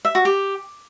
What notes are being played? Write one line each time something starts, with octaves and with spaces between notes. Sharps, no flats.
E5
F#4
G4